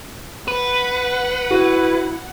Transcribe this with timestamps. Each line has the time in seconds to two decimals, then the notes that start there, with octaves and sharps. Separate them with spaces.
0.48 B4 F#5
1.51 E4 F#4